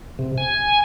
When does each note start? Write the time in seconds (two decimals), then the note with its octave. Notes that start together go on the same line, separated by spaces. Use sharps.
0.19 C3
0.38 G#5